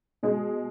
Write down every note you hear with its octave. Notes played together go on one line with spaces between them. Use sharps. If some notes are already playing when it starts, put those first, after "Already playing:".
B2 G#3